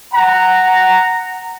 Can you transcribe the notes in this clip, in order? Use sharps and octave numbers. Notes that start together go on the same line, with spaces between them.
F#5 A#5